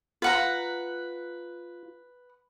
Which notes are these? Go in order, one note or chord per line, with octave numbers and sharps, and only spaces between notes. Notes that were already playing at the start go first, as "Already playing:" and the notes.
F4 B4 F#5 A#5